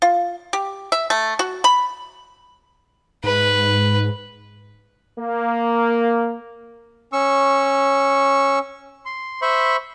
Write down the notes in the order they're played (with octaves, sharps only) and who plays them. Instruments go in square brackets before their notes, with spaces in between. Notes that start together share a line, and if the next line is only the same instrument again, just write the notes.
[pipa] F4
G4
E5
A3
F#4
B5
[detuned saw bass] G#2 [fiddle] B4
[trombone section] A#3
[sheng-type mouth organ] C#4 C#6 E6
C6
C5 E5 B5 C#6